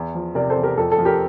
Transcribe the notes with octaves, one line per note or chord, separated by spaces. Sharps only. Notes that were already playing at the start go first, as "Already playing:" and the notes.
Already playing: E2
F3
C3 A#4 D5
A4 C5
E2
G4 A#4
F2 A4
A4
F3
G4 A#4